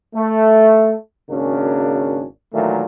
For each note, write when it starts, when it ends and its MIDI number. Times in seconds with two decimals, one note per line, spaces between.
0.15 0.94 57
1.29 2.24 32
1.29 2.24 49
1.29 2.24 58
1.29 2.24 61
1.29 2.24 62
1.29 2.24 66
2.53 2.84 46
2.53 2.84 51
2.53 2.84 52
2.53 2.84 54
2.53 2.84 57